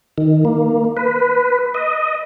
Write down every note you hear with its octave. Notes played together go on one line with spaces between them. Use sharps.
D#3
A#3
B4
D#5